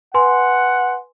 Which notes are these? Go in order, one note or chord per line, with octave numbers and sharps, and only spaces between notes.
B4 F#5 G#5 C6